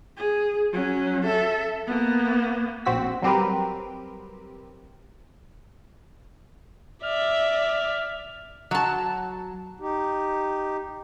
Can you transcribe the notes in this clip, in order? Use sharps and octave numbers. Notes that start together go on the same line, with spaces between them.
G#4
F#3 C#4
A4 E5
A#3 B3
A#1 C4 F#4 E6 B6
F#3 G3 C4 G4 A#4 B4
D5 E5 F6
F#3 A5
D#4 G4